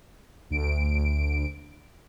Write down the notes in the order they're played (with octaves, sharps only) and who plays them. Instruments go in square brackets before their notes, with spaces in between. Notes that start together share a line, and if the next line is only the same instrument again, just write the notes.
[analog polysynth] D2 D7